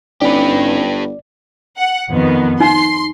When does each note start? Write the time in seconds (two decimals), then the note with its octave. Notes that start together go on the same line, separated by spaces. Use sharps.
0.21 G1 C#4 D#4 G4 B4 D5
1.78 F#5
2.09 F2 D#3 B3
2.60 D#4 C6